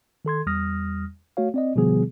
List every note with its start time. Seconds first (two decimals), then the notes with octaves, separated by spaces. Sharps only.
0.25 D#3 A4 C6 G#6
0.46 E2 G3 D#6 F6 A#6
1.37 A3 F#4 C#5 F5
1.54 C4 D5 D#5
1.76 B2 D3 F3 G3 B3 G#4